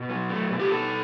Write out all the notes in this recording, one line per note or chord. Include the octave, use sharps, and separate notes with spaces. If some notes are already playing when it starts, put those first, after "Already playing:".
Already playing: B2
F#3
A3
B2
G4
B2 A4